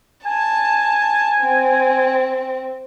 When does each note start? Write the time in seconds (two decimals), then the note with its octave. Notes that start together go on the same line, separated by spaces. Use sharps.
0.26 G#5 A5
1.41 C4